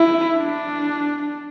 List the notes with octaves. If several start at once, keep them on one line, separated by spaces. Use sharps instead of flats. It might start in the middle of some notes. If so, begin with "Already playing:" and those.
Already playing: E4
D4